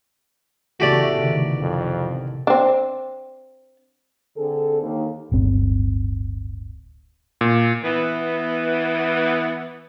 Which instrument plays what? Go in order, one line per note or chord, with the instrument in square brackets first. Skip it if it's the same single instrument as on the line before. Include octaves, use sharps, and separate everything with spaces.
[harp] A1 C#3 B3 [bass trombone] A3 [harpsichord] F#4 G4 D5
[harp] C3 D#3
[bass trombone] F2
[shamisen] C4 D4
[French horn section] D3 C4 G#4 A4
D#2
[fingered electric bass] D1 G1 C4
[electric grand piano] A#2
[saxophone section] E3 B3